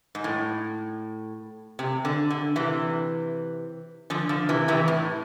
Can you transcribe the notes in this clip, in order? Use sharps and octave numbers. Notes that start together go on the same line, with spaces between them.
G#2
A2
C3
D3
D3
C3 E3
D3 F3
D3 F3
C3 E3
C3 E3
A2